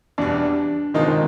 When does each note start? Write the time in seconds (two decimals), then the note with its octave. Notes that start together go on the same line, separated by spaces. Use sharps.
0.18 E2 B2 G3 D4
0.94 B2 D#3 G#3 C4 D#4 F4